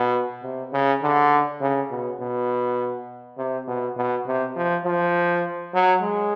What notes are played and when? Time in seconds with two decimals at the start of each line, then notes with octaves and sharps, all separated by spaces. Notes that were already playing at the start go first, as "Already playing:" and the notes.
Already playing: B2
0.43 C3
0.73 C#3
1.03 D3
1.61 C#3
1.90 B2
2.20 B2
3.38 C3
3.67 B2
3.97 B2
4.27 C3
4.56 F3
4.84 F3
5.74 F#3
6.02 G#3